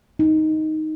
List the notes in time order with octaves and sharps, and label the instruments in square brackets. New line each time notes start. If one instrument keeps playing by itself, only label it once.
[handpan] D#4